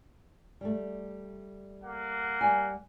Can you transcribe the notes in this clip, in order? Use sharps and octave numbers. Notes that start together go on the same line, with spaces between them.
G3 A3
A#3 F#5
G3 G#5